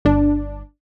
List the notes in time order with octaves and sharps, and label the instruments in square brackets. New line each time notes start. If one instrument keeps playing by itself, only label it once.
[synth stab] G1 D4